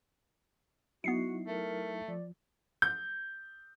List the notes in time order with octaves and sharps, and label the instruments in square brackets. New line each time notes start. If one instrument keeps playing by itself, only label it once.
[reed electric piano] F#3 D#4 E4 [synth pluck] B3 C7 C#7 [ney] F#4
[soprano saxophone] A3 [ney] A#4
[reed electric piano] F3 [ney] D5
[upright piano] G6